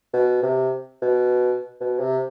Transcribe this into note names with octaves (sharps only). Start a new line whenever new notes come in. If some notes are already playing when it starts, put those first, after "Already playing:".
B2
C3
B2
B2
C3